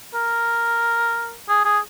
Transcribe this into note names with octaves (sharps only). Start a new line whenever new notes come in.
A#4
G#4
G#4